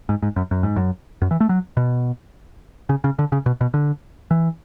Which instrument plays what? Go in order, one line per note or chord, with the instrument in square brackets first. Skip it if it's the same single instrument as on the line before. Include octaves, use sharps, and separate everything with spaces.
[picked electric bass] G#2
G#2
F#2
F#2
G#2
F#2
F#2
E3
A3
F#3
B2
C#3
C#3
D3
C#3
B2
B2
D3
E3